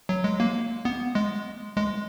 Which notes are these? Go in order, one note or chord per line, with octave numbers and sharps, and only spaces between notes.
F#3
G#3
A#3
B3
G#3
G#3